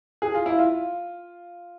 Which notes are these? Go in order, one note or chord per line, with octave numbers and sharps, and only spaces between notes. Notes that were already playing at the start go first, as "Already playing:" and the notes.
G#4
F4
E4
F4